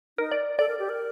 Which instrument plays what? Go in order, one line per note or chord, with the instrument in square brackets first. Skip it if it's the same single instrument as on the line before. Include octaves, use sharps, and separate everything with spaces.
[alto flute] D#4 [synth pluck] A#4
[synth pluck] D5
[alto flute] A4 [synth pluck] D5
[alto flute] A#4
G4
A#4